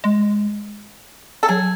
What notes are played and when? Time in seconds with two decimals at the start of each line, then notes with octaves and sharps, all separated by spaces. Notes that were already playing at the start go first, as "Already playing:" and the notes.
0.04 G#3
1.43 A4
1.48 F#3 G#4